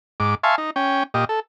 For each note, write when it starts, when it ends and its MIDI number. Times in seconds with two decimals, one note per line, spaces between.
0.20 0.35 44
0.20 0.35 86
0.43 0.56 76
0.43 0.56 77
0.43 0.56 80
0.43 0.56 81
0.43 0.56 84
0.43 0.56 85
0.58 0.70 63
0.76 1.03 61
0.76 1.03 79
1.14 1.25 46
1.14 1.25 67
1.14 1.25 75
1.29 1.40 69